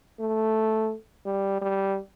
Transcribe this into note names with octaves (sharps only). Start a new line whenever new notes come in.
A3
G3
G3